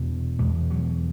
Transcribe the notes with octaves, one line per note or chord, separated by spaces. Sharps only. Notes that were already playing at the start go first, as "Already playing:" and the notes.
Already playing: E2 B2
E2 B2 G#3
F#3